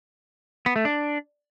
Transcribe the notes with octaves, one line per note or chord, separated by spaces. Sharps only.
B3
A3
D4